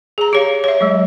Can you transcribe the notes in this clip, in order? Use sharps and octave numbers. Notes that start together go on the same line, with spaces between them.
G#4 A#5
G4 C#5 F5
C#5 E5
F#3 G#3